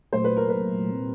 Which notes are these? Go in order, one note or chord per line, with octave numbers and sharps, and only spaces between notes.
A#2 F#3 A3 C5
B4
A#4
B4
A#2 G3 C4